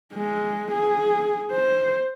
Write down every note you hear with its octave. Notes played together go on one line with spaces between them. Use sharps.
G#3
G#4
C5